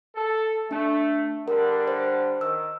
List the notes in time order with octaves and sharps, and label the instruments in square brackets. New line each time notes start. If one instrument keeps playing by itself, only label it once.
[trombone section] A4
[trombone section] A3 [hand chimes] D4
[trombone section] D3 G3 D4 [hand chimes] A#4
[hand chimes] C5
[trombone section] D#3 [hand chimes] E6